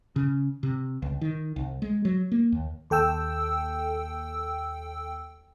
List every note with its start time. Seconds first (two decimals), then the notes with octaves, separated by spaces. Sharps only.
0.16 C#3
0.63 C3
1.02 C#2
1.21 D#3
1.56 C2
1.82 G#3
2.05 F#3
2.32 A#3
2.52 D#2
2.90 D#2 A4 G5 E6